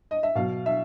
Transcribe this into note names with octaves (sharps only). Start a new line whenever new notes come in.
D#5
E5
B2 F#3 F5
E5